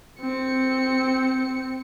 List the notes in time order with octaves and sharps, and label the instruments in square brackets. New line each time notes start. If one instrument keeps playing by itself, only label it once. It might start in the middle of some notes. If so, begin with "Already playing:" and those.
[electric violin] C4 C#7